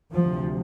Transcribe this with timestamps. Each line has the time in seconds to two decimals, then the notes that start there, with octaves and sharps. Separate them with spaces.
0.14 D2 C3 F3